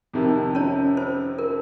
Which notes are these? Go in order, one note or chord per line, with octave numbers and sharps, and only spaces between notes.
F2 C3 D#3
C#4 C#5
C5
A#4